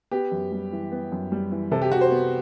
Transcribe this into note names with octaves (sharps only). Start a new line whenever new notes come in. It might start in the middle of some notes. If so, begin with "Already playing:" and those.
B3 G4
F#2
G3
E3
B3
F#2
G3
E3
C3 A4
G4
C3 F#4
C5
B3